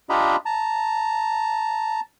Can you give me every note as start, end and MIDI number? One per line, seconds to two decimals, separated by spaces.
0.09 0.36 62
0.09 0.36 65
0.09 0.36 67
0.09 0.36 75
0.09 0.36 82
0.09 0.36 83
0.46 2.00 81
0.46 2.00 82